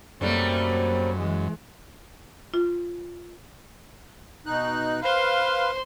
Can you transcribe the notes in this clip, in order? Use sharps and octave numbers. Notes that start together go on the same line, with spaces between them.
F#2 C3 F#3 G3 A3 A#3
E3 G#3
F4
B2 D#4 F#6
B4 C5 F5 C6